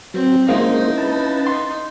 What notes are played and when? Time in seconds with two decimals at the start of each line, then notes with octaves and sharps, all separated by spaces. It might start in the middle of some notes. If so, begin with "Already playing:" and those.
0.14 F#3 C4
0.49 G#3 A#3 C#4 D#4 E4 C5 F5
0.97 B4 A5
1.47 D#4 C6